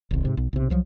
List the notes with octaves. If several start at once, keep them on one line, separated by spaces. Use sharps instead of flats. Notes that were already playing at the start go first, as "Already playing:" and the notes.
D#1 C2
G#2 C3
B1
B1 C3
C2 F3 F#3